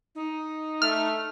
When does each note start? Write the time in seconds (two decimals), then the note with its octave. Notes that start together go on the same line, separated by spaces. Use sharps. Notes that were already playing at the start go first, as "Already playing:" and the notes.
0.15 D#4
0.82 A3 F6